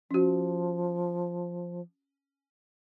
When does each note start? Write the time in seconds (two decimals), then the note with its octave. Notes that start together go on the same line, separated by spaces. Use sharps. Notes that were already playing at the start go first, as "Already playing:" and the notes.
0.11 F3 C#4 F#4